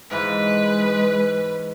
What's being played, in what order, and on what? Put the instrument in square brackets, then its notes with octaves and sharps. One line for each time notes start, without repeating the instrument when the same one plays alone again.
[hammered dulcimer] G#2 E3 [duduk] G#3 [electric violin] B4